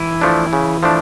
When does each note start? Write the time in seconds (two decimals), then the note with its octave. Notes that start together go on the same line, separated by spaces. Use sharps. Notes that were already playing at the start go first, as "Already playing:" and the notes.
Already playing: E3 E4
0.21 F3 A3 D4
0.53 C#3
0.83 F3 A3 D4